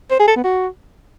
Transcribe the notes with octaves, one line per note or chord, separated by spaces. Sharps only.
C5
G#4
A4
B3
F#4